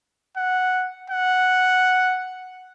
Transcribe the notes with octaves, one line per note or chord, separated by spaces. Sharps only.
F#5
F#5